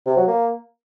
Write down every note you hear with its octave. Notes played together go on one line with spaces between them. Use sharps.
C3
F#3
A#3